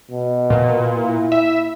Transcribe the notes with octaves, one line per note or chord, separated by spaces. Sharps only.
B2
A#2
E4
E5